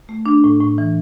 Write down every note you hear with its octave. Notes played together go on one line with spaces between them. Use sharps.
A3
D4
A2
A2
E3